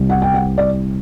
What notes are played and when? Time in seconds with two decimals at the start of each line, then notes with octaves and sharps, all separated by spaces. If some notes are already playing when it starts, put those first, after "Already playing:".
Already playing: C2 C3 G3
0.09 F#5
0.22 G5
0.34 F#5
0.58 D5